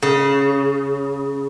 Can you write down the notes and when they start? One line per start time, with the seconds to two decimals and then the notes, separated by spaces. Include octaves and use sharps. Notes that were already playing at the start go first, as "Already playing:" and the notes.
0.02 C#3